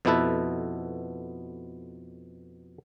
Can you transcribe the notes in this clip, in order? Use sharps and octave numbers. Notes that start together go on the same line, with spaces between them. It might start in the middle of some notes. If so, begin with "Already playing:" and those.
F2 B2 B3 E4 A4 B4